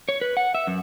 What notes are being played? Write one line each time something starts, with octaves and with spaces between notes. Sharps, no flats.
C#5
B4
F#5
E5
F#2